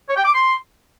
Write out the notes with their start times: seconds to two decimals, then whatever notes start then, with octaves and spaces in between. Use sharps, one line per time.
0.08 C#5
0.16 G5
0.25 D6
0.33 C6